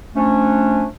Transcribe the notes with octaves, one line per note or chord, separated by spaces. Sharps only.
F3 A3 C#4 D4